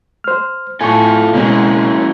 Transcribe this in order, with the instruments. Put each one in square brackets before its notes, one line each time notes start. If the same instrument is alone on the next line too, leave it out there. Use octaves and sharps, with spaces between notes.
[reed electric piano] C5 F6
[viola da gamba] A2 [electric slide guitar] F4 A4 [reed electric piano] G#5 A5 C#6
[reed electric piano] B2 C4 [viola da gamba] G#3 [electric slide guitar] A#3 C#4 E4